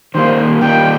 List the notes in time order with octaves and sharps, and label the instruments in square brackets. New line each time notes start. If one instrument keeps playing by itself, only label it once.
[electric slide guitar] D#3 G3 A#3 [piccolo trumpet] C5
[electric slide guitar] D#3 G3 A#3 D#4 [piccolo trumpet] G5